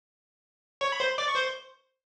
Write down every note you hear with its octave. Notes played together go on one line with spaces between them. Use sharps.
C#5 C#6
B5
C5 C6
D5 D6
C#6
C5 C6